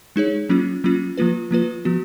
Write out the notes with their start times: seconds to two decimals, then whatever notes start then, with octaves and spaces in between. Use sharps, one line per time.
0.16 G#3 D#4 G#4 C#5
0.49 F#3 A#3 C#4 F4
0.84 F#3 A#3 C#4 F4
1.17 F3 A#3 F4 B4
1.51 F3 A#3 F4 B4
1.85 F3 B3 F#4